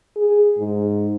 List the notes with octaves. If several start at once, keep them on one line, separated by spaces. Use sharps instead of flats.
G#4
G#2